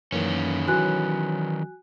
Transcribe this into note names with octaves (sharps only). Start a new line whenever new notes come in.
F#2 D#3 E3 A#3 C#4
E3 F#3 F#4 G#5 F#6